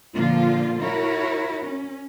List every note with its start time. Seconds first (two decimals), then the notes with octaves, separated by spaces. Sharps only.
0.16 A#2 D3 F3 A#3 F4
0.82 E4 F#4 A#4 C#5
1.66 C#4